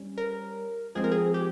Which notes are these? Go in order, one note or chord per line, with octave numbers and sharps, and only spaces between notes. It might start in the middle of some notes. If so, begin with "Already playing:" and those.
Already playing: G3 C#4
A#4
F3 G#3 C4 G#4
A#4
G#4
G4